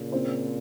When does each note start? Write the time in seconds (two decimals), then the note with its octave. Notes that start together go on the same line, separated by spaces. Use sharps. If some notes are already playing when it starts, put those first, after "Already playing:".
Already playing: A#2 C#3
0.12 C4 F4 C5